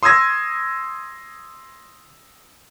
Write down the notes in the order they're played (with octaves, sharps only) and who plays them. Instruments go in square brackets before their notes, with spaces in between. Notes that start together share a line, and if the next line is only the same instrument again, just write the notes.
[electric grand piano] C6 D#6 E6 G#6 A#6